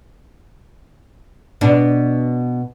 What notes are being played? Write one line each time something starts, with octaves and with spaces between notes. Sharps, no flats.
B2 D4